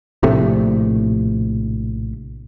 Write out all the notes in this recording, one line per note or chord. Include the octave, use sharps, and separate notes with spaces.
A#1 A2 C3 A3